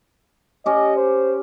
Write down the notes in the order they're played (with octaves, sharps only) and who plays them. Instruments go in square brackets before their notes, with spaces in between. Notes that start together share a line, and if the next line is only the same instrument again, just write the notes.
[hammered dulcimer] C#4 G4 [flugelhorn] D#5
[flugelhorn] C5